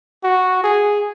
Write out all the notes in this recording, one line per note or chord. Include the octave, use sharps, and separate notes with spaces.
F#4
G#4